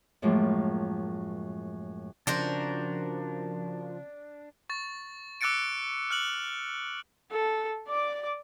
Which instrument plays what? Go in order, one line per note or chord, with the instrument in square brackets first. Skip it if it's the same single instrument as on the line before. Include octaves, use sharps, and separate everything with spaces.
[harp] F#2 A2 F3 G#3 A#3
[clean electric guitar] C#3 C4 D#4 [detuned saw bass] F3 [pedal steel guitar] D4 [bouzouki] F#4 A#4 C5
[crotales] C#6 A6
D6 E6 F#6 A6 C#7 D7
F6 F#6 F#7
[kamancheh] A4
D5 D6